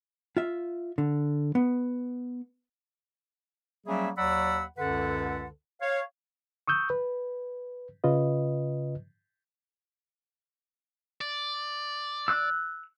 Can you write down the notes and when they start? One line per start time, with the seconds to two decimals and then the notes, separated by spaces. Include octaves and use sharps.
0.37 F4 E5
0.98 D3
1.55 B3
3.87 F#3 G3 A#3 C#4 G#4 E5
4.17 D#2 F#3 D5 F#5 B5 E6
4.78 C#2 F#2 D3 A4 B4 F#5
5.82 C#5 F5
6.67 C#6 D#6 E6 G6
6.90 B4
8.04 C#3 F4 B4 D#5
11.21 D5
12.28 E6 F#6